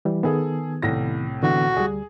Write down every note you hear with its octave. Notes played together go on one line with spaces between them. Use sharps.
E3 G3
D#3 B3 G#4 A4
C2 A2 A#6
D3 E3 B3 F#4
D2 G3 G#4